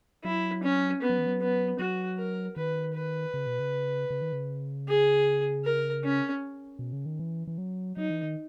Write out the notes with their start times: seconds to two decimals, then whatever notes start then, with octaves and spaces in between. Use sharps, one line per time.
0.24 F#3 E4
0.63 C#4
1.02 B3
1.09 F#3
1.19 E3
1.27 F#3
1.41 B3
1.79 F#3 F#4
2.18 A#4
2.56 D#3 B4
2.94 B4
3.34 C#3
3.47 B2
3.60 C#3
4.10 C#3
4.22 D#3
4.32 C#3
4.88 G#4
5.65 A#4
6.04 C#4
6.79 B2
6.93 C#3
7.06 D#3
7.19 E3
7.47 E3
7.58 F#3
7.96 F#3 D#4
8.10 E3
8.23 D#3